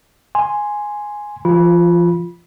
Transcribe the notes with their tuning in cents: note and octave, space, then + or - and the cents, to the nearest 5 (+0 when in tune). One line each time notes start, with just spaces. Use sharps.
G#5 +0 C6 +0
F3 -40 F4 -5 B5 -25